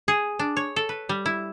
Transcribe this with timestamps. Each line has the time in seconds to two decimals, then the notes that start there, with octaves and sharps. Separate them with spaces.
0.08 G#4
0.39 D4
0.57 C#5
0.76 A4
0.89 B4
1.09 G3
1.26 E4